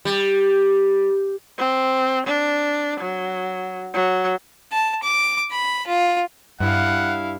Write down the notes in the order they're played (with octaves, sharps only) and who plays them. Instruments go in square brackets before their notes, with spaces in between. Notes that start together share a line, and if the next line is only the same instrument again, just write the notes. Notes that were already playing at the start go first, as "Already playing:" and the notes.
[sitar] G3
[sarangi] C4
D4
F#3
F#3
[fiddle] A5
D6
B5
F4
[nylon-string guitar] G2 [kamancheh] E4 F5 [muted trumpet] F#5